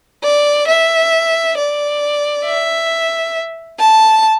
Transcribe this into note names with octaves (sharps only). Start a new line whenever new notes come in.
D5
E5
D5
E5
A5